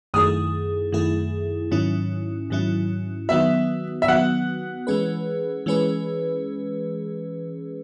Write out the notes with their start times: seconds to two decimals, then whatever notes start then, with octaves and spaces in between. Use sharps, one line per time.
0.14 F#2 D#3 A3 E4 G#4 D#6
0.92 F#2 D#3 A3 E4 G#4
1.71 G#2 D#3 F#3 C#4 E4
2.50 G#2 D#3 F#3 C#4 E4
3.29 D#3 F#3 B3 F#4 E5
4.02 E5
4.08 D#3 F#3 B3 F#4 F#5
4.87 E3 G#3 C#4 G#4 B4
5.66 E3 G#3 C#4 G#4 B4